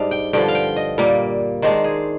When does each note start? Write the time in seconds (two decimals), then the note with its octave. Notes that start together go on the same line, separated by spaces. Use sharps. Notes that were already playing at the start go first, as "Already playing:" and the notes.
Already playing: G#2 G3 D4 D#5 F5
0.11 G5
0.33 G2 D3 F3 G5
0.48 F5
0.55 G5
0.76 D#5
0.98 A#2 G3 A#3
1.62 D#3 G#3 D4 C5
1.84 G#4